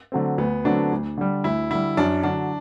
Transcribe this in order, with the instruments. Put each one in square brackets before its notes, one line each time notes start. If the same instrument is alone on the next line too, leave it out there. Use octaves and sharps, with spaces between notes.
[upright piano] D3 F#3 A3 C4
[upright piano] D2 [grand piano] B3
[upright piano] D3 F#3 A3 C4 [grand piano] D4
[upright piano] D2
D3 G3
[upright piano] D2 [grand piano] E4
[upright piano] D3 [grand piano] E4
[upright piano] G3
[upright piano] F#2 [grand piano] D4
[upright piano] D3 F#3 [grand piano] D4